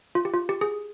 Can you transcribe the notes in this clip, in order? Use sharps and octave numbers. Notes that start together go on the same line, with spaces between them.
F4
G4
F4
G4
G#4